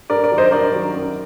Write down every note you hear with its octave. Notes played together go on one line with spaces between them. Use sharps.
G2 A#4 D5
A#4 D5
D#3 F#3
C5 D#5
G2 A#4 D5
D#3 F#3
F#2